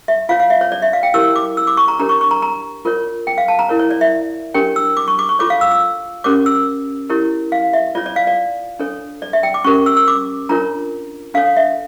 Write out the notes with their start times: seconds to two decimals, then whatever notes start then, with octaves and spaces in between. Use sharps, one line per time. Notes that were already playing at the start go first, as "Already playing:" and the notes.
0.08 E5
0.29 F4 C#5 F5
0.40 F5
0.50 E5
0.61 C#5
0.72 D5
0.82 E5
0.93 F5
1.03 G5
1.14 E4 G4 A#4 C#5 E6
1.36 D6
1.57 E6
1.67 D6
1.77 C#6
1.88 A#5
1.99 D4 G4 A#4 C#5 A#5
2.09 C#6
2.21 C#6
2.31 A#5
2.42 A#5
2.85 F4 A#4 C#5
3.27 G5
3.38 F5
3.48 A5
3.59 A#5
3.69 E4 A#4 C#5
3.79 C#5
3.91 D5
4.01 E5
4.54 D4 G4 A#4 C#5 G5
4.76 E6
4.97 D6
5.08 C#6
5.19 D6
5.29 C#6
5.39 F4 A4 C#5 D6
5.50 F5
5.61 E6
5.71 E6
6.24 C#4 G4 A#4 C#5 D6
6.46 E6
7.10 E4 G4 A#4 C#5
7.52 F5
7.73 E5
7.95 F4 C#5 D5
8.06 D5
8.16 F5
8.27 D5
8.79 D4 A4 C#5
9.22 D5
9.33 E5
9.43 G5
9.54 D6
9.64 C#4 G4 A#4 C#6
9.86 E6
9.97 E6
10.08 D6
10.49 D4 F4 A#4 C#5 A#5
11.34 D4 A4 C#5 F5
11.57 E5